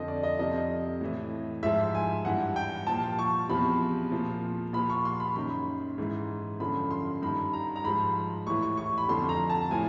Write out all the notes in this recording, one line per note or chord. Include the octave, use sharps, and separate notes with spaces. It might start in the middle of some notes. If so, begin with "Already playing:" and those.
Already playing: F2 D3 F3 D#5
D5
D#5
F2 C3 F3 D#5
A2 E3
G#2 F3 E5
G#5
G2 E3 F#5
G5
A#2 F3 A5
C#6
E2 C3 F3 B5
A#2 F3
A#2 F3 B5
C#6
C6
B5
F#2 D#3 B5
G#2 E3
F#2 D3 F3 B5
C6
G2 D#3 B5
A#5
A#5
G#2 F3 B5
A2 E3 C#6
C#6
C#6
B5
F2 D3 F3 C6
A#5
A5
A2 F3 G#5